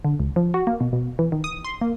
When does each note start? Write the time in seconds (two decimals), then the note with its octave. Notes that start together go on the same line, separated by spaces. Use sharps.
0.05 D3
0.20 C#2
0.36 F3
0.54 F#4
0.67 A#3
0.80 B2
0.93 B2
1.19 E3
1.32 D#3
1.44 D#6
1.64 C6
1.81 A#3